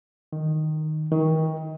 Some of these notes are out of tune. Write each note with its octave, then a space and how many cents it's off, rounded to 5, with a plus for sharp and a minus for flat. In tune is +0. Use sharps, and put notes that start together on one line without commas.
D#3 -5
D#3 +30